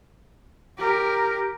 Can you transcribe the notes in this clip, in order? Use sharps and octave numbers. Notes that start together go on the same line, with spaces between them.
G4 A#4